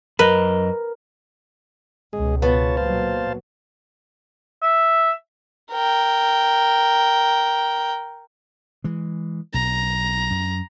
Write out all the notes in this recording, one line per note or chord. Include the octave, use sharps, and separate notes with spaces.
F#2 A#4 B4 D#5
C#2 B2 G#3 G#4
B3 F4 C#5 A5
A#2 F#3 C5 F5 A5
E5
A#4 G5
E3 G#3
B1 A#5
F#2